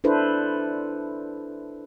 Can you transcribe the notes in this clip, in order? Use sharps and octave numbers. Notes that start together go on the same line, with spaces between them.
D4 E4 A4 B4 C5